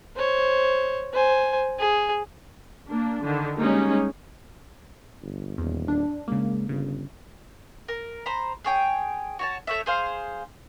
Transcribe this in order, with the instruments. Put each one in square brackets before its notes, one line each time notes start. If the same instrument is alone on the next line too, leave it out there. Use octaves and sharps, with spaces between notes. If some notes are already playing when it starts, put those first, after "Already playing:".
[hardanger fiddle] C5 C#5
C5 G#5
G#4
[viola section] A#3 D4
D3 D#3
G3 G#3 A#3 C#4 D#4
[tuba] G1
[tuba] D#1 [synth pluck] E2
[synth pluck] D4
[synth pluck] C#3 A#3 [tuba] G#3
[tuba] G1 [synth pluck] C#3
[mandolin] A#4
C5 A#5 B5
G#4 C#5 G5
F#4 C#5 A5
A3 C#5 E5
G#4 C5 F5